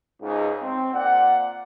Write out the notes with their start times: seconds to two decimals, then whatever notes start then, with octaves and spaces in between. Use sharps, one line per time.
0.21 C#2 G#2
0.61 C4
0.94 A#2 D5 F#5